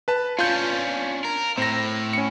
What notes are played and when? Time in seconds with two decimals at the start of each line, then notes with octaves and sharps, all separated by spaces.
0.08 B4 A5
0.39 C#4 D4 F4 G6
1.25 A#4
1.58 A2 C4 A#6
2.13 C#4 C#7